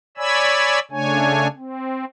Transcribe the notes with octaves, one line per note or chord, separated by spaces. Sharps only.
C#5 D5 G#5 B5 E6
C#3 A3 D4 C#5 G#5
C4